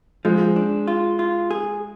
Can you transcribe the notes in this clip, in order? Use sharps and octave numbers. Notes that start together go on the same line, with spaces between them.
F3 G#3
D4
F4
F4
G#4